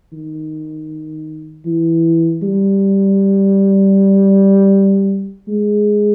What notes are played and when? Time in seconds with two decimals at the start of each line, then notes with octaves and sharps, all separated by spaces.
0.13 D#3
1.66 E3
2.43 G3
5.48 G#3